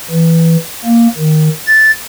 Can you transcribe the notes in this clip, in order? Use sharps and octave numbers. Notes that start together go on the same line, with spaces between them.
E3
A#3
D#3
A6